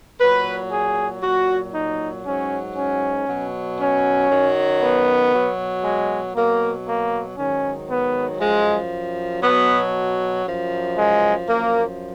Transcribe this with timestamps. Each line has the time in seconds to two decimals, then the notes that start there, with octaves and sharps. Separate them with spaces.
0.19 A#2 F#3 B4
0.71 G#4
1.21 A#2 F#3 F#4
1.73 D#4
2.24 G#2 F#3 C#4
2.76 C#4
3.27 B2 F#3
3.79 C#4
4.29 F#2 D#3 F#3
4.81 B3
5.32 B2 F#3
5.84 G#3
6.35 B2 F#3 A#3
6.86 A#3
7.37 G#2 D#3 F#3 C#4
7.88 B3
8.40 F#2 F3 G#3
9.42 B2 F#3 B3
10.45 F#2 F3
10.96 G#3
11.47 F#2 F3 A#3